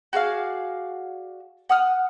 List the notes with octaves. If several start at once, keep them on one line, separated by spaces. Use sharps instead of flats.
F#4 G#4 D5 F5
F#5 D#6 F6